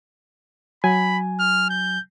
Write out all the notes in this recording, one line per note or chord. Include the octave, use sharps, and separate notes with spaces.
F#3 G#5 B5
F6
G6